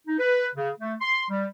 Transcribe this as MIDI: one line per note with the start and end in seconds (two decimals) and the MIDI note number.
0.08 0.19 63
0.19 0.48 71
0.56 0.70 49
0.80 0.93 57
1.01 1.25 84
1.30 1.46 55